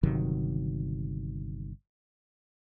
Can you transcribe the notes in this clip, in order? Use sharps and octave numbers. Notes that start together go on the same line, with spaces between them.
G1 C3 D#3 F#3